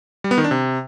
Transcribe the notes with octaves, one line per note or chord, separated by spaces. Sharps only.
G3
B3
D#3
D4
C3